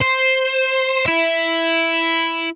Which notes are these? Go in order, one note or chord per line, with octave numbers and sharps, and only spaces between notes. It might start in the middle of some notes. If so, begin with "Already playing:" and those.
C5
E4 E5